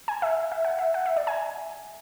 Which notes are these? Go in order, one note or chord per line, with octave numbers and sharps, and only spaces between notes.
G#5
E5
E5
F#5
E5
F#5
E5
D5
G#5